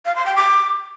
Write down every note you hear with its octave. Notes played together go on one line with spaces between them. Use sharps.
F5
C6
G5
D6